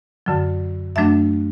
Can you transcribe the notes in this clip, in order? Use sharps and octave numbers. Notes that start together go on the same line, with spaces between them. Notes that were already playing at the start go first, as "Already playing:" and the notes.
F#2 D3 F#3
F#2 F#3 A3 D4 E5